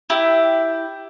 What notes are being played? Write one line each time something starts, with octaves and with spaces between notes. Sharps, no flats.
E4 G4